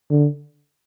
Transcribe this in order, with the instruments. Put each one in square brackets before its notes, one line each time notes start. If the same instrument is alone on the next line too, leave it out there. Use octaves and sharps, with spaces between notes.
[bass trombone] D3